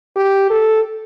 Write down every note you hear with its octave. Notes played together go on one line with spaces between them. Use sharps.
G4
A4